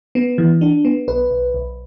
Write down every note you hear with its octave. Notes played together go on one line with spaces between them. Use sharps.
B3
E3
D4
B3
B1 B4
B1
B1